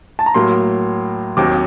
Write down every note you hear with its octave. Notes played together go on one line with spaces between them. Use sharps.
A5
A#5
A2 F#3 A#3 C6
D#2 D#3 F#3 C4 D6